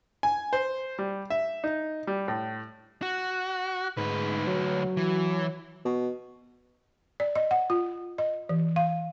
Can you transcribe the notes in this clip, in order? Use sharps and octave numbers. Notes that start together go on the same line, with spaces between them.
G#5
C5
G3
E5
D#4
G3
A2
F#4 F#6
D2 G#2 B4
F#3
E3
B2
D5
D#5
F#5
F4
D#5
E3
F5